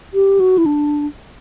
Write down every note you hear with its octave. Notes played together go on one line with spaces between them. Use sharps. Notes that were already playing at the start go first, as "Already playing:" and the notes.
G4
F#4
E4
D4